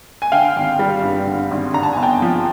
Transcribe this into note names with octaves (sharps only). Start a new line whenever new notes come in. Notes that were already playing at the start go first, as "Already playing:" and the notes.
G#5
D3 F5 G5
G#1
G3
G2
D3
G#1
D3 A#5
A5
G1 G#5
G5 A5
F3